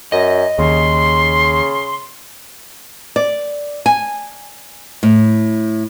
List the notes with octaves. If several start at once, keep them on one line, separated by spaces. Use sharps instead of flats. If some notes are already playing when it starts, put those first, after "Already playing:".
F#2 D#5
D#2 C#3 C6
D5
G#5
A2